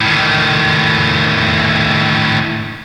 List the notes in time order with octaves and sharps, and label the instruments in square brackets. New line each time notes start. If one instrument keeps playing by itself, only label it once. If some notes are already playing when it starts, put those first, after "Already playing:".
[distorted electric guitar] A2 D#3